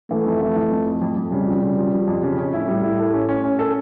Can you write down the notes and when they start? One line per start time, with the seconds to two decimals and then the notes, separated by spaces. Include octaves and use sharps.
0.11 E3 A3
0.26 F2
0.41 E3
0.56 E3
0.71 F2
0.86 F2
1.02 F2
1.17 F2
1.32 C#3 G3
1.47 F3
1.62 C#3
1.78 F3
1.92 F3
2.08 F2
2.23 C#3
2.38 C#4
2.53 A2 E4
2.68 G3
2.83 E4
2.99 A4
3.14 C#4
3.29 C#4
3.44 C#4
3.59 A4